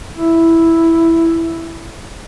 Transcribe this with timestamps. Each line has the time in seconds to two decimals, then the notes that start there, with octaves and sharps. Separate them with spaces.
0.16 E4